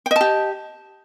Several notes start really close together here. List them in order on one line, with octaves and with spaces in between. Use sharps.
G5 D#5 A5 G4